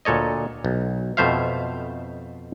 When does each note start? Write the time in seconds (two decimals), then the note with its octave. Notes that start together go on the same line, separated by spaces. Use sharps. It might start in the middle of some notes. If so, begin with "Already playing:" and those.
0.05 D2 A#2 A4 C#5 D#5
0.65 B1
1.17 F2 B2 A3 C5 E5 F5